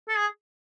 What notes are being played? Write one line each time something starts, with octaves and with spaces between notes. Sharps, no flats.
A4
G#4